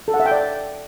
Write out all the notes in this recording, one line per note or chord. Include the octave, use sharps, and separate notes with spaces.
A4
F#5
E5
G5
D5